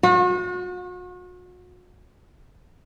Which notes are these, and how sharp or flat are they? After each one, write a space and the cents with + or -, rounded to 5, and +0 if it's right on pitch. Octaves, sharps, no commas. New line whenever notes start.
F#4 -40